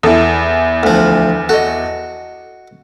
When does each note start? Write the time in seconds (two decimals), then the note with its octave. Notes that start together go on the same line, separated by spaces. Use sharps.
0.03 E2 E4 A4
0.83 D2 F3
1.49 F#4 A4 D#5